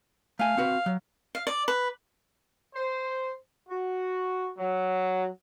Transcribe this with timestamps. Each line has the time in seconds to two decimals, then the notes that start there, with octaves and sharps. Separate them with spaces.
0.39 A3 F5 G#5
0.57 C4 F#4 B4
0.86 F#3
1.35 F5
1.47 D5
1.68 B4
2.75 C5
3.69 F#4
4.58 F#3